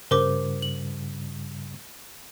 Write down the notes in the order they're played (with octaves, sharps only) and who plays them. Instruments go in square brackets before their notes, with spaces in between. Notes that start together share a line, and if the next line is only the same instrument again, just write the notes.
[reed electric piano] G2 C#3 G3 [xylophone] A#4 C5 D6
[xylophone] F#7